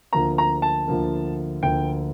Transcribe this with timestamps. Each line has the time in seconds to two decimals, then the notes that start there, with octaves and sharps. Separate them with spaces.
0.13 D2 D3 F3 A#3 A#5
0.38 A#5
0.62 A5
0.88 D2 D3 F3 A#3
1.63 D2 D3 F3 A#3 G5